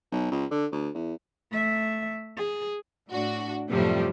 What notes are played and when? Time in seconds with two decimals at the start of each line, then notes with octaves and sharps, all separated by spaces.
0.12 B1
0.31 C#2
0.51 D3
0.72 D2
0.94 E2
1.52 A3 E5
2.37 G#4
3.11 A2 D4 F#4
3.69 F#2 A2 C3 F3 G3 A3